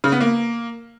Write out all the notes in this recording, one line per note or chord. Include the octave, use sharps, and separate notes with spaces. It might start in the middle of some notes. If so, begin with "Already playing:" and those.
C#3
B3
A#3